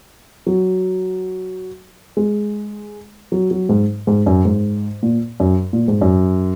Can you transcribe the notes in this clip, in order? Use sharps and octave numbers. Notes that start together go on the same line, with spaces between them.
F#3
G#3
F#3
F#3
G#2
G#2
F#2
G#2
A#2
F#2
A#2
G#2
F#2